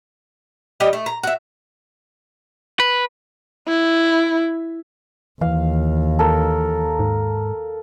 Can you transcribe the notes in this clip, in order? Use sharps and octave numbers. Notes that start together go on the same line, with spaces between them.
G3 D4 G4 D#5
A3
A#5
F#4 E5
B4
E4
D#2 E3 F5
A4 A#4
G#2